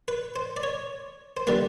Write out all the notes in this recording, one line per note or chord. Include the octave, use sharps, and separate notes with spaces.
B4
C5
D5
C#5
C5
D3 G3 A#3 B4